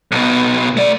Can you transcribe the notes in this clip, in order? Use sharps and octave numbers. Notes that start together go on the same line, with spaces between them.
B1 B2
A3 D5